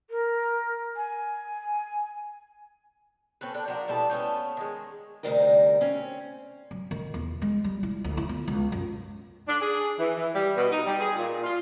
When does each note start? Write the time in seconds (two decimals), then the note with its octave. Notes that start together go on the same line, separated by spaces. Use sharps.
0.10 A#4
0.96 G#5
3.41 C4 C#4 A4 B4
3.54 D4 A4 A#4
3.67 F3 D4 F#4 A#4
3.88 B2 G3 E4 A4
4.10 A3 B3 C#4 G5
4.57 D#3 G#3
5.23 D2 C3 G3 D#4 A#4
5.81 C4 C#4
6.71 F#3
6.91 D#3
7.14 E2
7.42 G#3
7.64 G3
7.83 E4
8.04 D2
8.17 E4
8.29 B3
8.48 C#2
8.72 F#2
9.48 D4
9.61 G#4
9.99 E3
10.16 E3
10.34 G3
10.56 B2
10.72 D#4
10.86 G3
11.00 G#4
11.16 A#2
11.44 F4